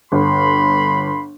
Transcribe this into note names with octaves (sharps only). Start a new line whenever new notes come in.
G1 B5 C6